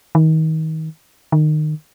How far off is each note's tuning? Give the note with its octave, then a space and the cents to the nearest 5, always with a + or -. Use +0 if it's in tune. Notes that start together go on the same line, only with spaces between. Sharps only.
D#3 +30
D#3 -25